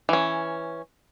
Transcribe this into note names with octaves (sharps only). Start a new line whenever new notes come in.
E3 C#4